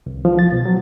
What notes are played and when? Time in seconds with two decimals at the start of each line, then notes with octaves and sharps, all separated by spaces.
0.06 C2
0.25 F3
0.39 A6
0.52 B2
0.65 F#3